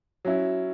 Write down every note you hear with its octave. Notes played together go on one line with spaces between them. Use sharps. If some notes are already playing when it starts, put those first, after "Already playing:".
F#3 C#4 E4